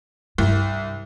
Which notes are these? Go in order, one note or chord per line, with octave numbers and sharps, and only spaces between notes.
C2 G2